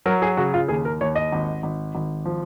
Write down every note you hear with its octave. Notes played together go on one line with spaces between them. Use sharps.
F#3 A#4
G#4
C#3 F#4
F4
D#2 G#4
A#4
D#2 C#5
D#5
G#1
G#1
G#1
F3